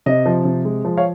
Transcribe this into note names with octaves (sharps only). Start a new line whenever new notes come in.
C3 D#5
F3
C3
G#3
F3
C#5 F5